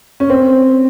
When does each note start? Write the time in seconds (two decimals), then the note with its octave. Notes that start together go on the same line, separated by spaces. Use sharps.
0.20 C#4
0.30 C4